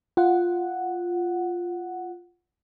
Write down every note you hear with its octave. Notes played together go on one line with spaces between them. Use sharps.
F4 F#5